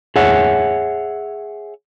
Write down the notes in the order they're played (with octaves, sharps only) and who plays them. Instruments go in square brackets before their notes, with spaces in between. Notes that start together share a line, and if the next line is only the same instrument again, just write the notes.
[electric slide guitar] G#4 C#5 E5 F#5